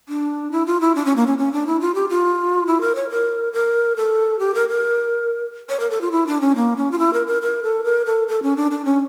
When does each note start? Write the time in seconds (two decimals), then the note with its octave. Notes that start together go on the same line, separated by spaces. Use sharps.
0.09 D4
0.52 E4
0.66 F4
0.81 E4
0.95 D4
1.05 C#4
1.16 A#3
1.27 C#4
1.38 C#4
1.52 D4
1.67 E4
1.81 F4
1.95 G4
2.09 F4
2.67 E4
2.81 A#4
2.95 C#5
3.10 A#4
3.53 A#4
3.96 A4
4.39 G4
4.54 A#4
4.69 A#4
5.69 C#5
5.80 A#4
5.90 A4
6.01 F4
6.12 E4
6.27 D4
6.41 C#4
6.56 A#3
6.77 C#4
6.91 F4
6.99 E4
7.13 A#4
7.27 A#4
7.42 A#4
7.63 A4
7.84 A#4
8.06 A4
8.28 A4
8.43 C#4
8.56 D4
8.71 D4
8.85 C#4